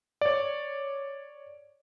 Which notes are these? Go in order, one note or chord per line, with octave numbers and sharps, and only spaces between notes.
C#5 D5